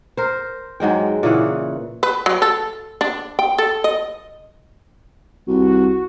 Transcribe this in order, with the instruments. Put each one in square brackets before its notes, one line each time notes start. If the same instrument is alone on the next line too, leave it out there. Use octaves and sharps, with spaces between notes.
[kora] A#4 C5
G#2 F#3 G#3 G5
A#2 C#3 E3 F#5
[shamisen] B4
F#3
A4
D4
G5
A4
D#5
[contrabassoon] C2 [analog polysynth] F#4